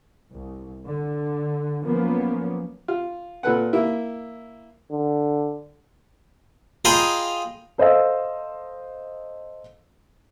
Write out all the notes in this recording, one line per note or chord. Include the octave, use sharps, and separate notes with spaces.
C2
D3
F3 F#3 A#3 B3 C#4
F4
A#2 A4 B4 F#5
A#3 E4
D3
F4 G#4 D#5 G5 A#5 B5
A4 C5 D#5 F5 E6